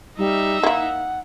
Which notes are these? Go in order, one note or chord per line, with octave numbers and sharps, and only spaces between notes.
G3 D#4 E5
A#3 E4 F#5